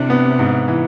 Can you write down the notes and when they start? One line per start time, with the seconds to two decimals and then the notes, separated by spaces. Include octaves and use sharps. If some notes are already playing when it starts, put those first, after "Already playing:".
Already playing: C3 E3 D4
0.10 B3
0.39 G#2
0.68 E3